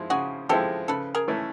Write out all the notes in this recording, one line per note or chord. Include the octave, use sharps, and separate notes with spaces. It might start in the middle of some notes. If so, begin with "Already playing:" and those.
Already playing: F3 G#3 C4 E4
C#3 F#4 G#4
F3 G#3 C4 E4 G4 A4
C#3 A4 B4
G#4 A#4
E3 A3 C#4